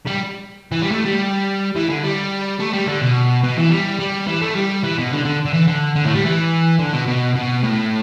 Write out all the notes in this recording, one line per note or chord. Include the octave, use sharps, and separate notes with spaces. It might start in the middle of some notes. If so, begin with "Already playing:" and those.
G3
E3
G3
A3
G3
E3
D3
G3
A3
G3
D3
B2
B2
E3
G3
G3
E3
A3
G3
E3
B2
D3
D3
D3
E3
D3
D3
A2
G3
E3
D3
B2
B2
B2
A2